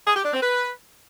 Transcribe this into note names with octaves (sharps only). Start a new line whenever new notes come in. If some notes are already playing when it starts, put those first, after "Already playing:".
G#4
G4
D4
C4
B4